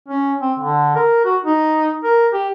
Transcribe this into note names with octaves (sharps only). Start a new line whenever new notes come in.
C#4
C4
D3
A#4
F#4
D#4
A#4
G4